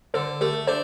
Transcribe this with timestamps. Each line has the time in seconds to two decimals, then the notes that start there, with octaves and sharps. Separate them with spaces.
0.14 D3 A4 C5
0.41 A3 G4 A#4
0.67 D4 A4 C5